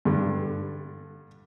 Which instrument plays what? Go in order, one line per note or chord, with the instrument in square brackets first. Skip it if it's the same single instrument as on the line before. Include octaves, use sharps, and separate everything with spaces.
[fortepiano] G2 D3